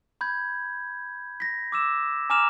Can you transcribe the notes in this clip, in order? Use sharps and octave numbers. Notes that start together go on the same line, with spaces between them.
B5 G6 G#6
A#6 B6
D6 E6 E7
G#5 A#5 D6 F6 E7 F7